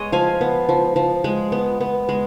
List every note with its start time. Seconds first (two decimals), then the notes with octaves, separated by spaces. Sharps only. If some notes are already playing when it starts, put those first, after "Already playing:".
Already playing: G#3 B3 C#5 D#5
0.12 F3 F5 G#5
0.41 B3
0.69 F3
0.96 F3
1.24 G#3
1.52 B3
1.81 B3
2.09 G#3